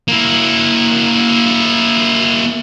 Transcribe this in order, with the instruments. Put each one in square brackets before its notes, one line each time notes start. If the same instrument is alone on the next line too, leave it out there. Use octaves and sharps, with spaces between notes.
[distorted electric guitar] A#3 E4